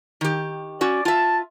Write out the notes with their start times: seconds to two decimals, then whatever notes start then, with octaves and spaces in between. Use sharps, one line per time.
0.21 D#3 G4
0.81 C#4 F#4 D5
1.05 F4 E5 A5